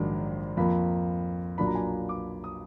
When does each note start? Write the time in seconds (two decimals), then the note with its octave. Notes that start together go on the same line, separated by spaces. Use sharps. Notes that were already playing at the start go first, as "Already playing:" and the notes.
Already playing: A#1 G#2 D#3 F#3 D4
0.57 F2 F3 A#3 B5
1.58 B1 A#2 F#3 A#3 D4 B5
1.67 A#5
1.75 G#5
1.84 A#5
2.09 D6
2.44 D#6